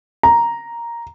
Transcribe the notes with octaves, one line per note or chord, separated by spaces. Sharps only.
A#5